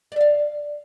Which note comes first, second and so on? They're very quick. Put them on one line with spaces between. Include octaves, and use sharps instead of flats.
D5 E5 F5